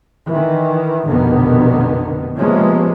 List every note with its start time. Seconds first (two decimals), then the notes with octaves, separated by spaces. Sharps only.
0.26 D#3 E3
1.07 F1 A#1 B2 D3 D#3 B3
2.37 C3 F3 G#3 A#3 B3 C#4